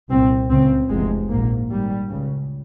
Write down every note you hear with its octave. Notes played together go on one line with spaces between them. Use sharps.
C2 A#2 C4
C#2 C#3 C4
F1 E2 C3 G#3
A#1 G#2 A#3
G#1 G#2 G3
C#2 C#3